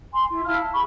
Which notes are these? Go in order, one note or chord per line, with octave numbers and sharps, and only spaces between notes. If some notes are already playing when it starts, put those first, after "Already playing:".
G#5 C6
E4
E4 F5 A5 F6
A5
G#4 B5 C#6